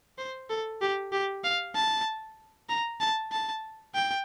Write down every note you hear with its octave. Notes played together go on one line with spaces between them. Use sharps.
C5
A4
G4
G4
F5
A5
A#5
A5
A5
G5